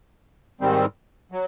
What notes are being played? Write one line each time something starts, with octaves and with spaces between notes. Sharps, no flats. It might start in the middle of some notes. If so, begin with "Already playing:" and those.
G#2 D#3 G3 C4
F#3